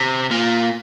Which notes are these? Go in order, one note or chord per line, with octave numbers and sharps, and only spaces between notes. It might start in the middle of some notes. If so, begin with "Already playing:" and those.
Already playing: C3
A#2